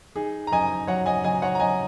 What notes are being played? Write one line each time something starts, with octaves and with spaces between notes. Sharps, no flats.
D#4 G#4
A#5
F#2 D#5 G#5
F#3 C#5 F#5
D#5 G#5
F#3 D#5 G#5
C#5 F#5
A#5
F#3 D#5 G#5